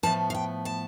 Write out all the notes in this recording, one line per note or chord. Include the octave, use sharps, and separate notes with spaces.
A2 F3 B3 A5
F5
G5
A5